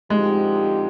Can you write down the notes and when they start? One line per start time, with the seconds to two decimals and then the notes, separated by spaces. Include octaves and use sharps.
0.10 D3 F3 G#3 C4 D#4 G4